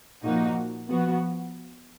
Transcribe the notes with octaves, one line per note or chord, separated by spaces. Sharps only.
A#2 F3 A#3 D#4 F#4
F3 B3 F#4